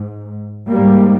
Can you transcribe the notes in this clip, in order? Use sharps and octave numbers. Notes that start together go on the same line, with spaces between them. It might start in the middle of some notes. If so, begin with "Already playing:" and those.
Already playing: G#2
G#2 G3 A#3